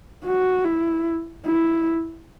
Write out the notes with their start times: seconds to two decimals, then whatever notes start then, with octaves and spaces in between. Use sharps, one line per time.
0.25 F#4
0.65 E4
1.46 E4